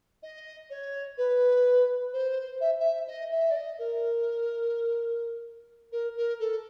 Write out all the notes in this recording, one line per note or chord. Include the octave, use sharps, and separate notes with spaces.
D#5
C#5
B4
C5
E5
E5
D#5
E5
D5
D#5
A#4
A#4
A#4
A4